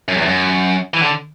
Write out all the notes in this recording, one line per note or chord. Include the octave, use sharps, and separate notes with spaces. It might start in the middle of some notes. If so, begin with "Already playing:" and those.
F#2
E2
F#2
E3
D3